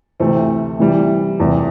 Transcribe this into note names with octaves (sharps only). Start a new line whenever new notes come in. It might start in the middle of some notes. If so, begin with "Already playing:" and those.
D2 C3 E3 A3 C4
C3 E3 G3
E1 E2 C3